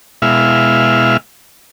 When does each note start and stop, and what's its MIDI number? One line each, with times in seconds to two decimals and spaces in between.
0.22 1.17 47
0.22 1.17 56
0.22 1.17 64
0.22 1.17 76
0.22 1.17 77
0.22 1.17 89